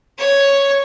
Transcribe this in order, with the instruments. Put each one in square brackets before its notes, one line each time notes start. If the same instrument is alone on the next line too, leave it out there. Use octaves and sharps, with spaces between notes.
[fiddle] C#5